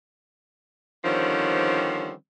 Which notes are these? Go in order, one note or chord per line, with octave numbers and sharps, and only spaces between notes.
D3 D#3 F3 G3 C4 C#4